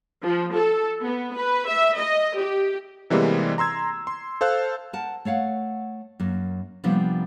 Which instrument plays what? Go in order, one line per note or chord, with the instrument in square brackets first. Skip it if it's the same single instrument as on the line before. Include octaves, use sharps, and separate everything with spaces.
[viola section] F3
A4
B3
B4
E5
D#5
G4
[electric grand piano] C3 E3 G3 G#3 A#3 B3
A#5 C6 E6 G#6
C6
A4 C5 F5 E6 F#6
[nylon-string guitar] A#4 F#5 A5
A3 C#5 F5 F#5
F#2 A#3
C3 F3 G3 A#3 B3 D4